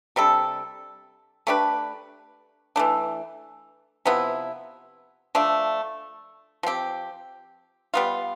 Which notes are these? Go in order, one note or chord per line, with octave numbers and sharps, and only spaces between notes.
C3 G3 D4 A4
A3 D4 G4 B4
E3 A3 D4
C3 F3 B3 E4
F3 A3 D4
F3 C4 G4
G3 B3 F4